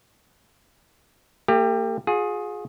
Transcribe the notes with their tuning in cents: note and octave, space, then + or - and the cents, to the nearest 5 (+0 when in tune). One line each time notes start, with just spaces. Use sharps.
A#3 -45 G4 +15
F4 +45 G#4 +5